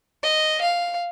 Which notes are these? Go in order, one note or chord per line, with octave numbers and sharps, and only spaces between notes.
D#5
F5